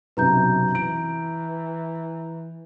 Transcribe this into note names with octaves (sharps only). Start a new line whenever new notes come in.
B1 F#2 C3 B4 A#5 G6
E3 D7